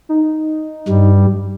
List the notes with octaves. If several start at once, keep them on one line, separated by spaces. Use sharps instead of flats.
D#4
G2 G3